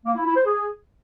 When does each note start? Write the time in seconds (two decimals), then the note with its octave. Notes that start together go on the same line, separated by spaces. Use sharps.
0.06 A#3
0.16 E4
0.26 E4
0.36 C5
0.46 G#4